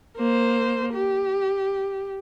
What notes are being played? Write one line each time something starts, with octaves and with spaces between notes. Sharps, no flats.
A#3 C5
G4